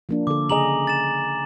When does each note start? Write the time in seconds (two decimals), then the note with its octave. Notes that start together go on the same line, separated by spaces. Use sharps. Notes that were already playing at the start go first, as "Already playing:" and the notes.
0.09 F3 A#3 D4
0.27 D3 A4 D6
0.50 C#3 G#4 D#5 G#5 A#5 F#7
0.87 A6 E7